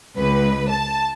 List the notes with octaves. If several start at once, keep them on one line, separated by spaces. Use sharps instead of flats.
C#2 B4
A5